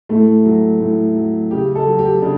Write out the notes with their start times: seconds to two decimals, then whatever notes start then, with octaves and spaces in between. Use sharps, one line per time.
0.09 A2 A3
0.46 F#3
0.81 A2
1.16 F#3
1.51 C#3 G4
1.75 A4
1.87 F#3
1.99 G4
2.22 C#3 D4